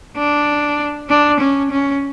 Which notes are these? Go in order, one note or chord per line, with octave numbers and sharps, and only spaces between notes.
D4
D4
C#4
C#4